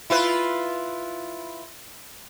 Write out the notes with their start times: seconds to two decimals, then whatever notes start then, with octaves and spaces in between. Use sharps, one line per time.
0.10 E4 F4 B4